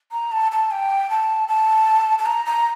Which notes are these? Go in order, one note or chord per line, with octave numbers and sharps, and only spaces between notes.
A#5
A5
A5
G5
A5
A5
A5
A#5
A#5